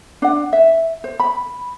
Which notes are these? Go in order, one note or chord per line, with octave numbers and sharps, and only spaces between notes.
D4 F#5
E5
C5
B5